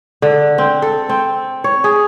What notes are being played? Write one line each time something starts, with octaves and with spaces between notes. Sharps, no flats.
D3
C4
A4
C4
C#5
G#4